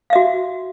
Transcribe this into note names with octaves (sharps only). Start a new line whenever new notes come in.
F#4 E5 F5